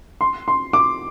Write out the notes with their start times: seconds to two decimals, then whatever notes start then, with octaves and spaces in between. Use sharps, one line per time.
0.21 C6
0.48 C6
0.73 D6